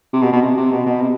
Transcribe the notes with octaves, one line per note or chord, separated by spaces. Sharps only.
C3
B2
B2
C3
C3
B2
B2
C3